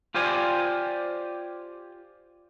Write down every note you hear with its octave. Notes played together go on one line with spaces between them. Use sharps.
F4 G4 C5 D5 G#5